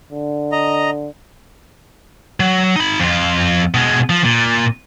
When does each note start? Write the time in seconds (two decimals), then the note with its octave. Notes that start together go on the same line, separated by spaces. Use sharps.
0.12 D3
0.52 D#5 A#5
2.40 F#3
2.76 D#4 B5
3.00 F2 F4
3.74 B2 G#3
4.10 F3
4.24 A#2